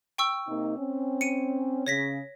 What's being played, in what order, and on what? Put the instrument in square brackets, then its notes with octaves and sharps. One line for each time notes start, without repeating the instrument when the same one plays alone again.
[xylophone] G5 C#6 E6
[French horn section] C3 A#3 D#4
C4 C#4
[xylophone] C#7 D#7
[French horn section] C#3 [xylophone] C#5 A#6 B6